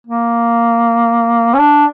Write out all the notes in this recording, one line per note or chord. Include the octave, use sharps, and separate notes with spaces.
A#3
C#4
D4